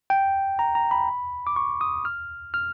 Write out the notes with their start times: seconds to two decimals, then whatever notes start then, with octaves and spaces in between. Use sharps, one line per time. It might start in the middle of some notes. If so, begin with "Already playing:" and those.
0.10 G5
0.59 A#5
0.75 A#5
0.91 B5
1.47 D6
1.56 C#6
1.81 D#6
2.05 F6
2.54 F6